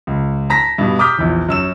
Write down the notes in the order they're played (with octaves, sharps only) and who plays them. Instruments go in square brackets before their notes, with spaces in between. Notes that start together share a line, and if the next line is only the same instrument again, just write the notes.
[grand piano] C#2
A5 A#5 A#6 B6
G2 B2
A#5 D6 D#6 F6 G6 B6
A#1 E2
F#2 E6 E7